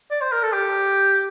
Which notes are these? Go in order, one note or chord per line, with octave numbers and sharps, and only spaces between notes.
D5
C5
A#4
A4
G4